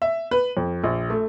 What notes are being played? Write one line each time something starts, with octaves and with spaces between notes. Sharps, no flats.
E5
B4
F2
A#1
A3